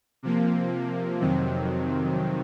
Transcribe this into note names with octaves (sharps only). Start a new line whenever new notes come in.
C3 F3 A#3
F2 C3 D#3 F#3 C4